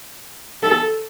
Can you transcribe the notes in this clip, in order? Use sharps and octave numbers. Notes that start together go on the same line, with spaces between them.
A4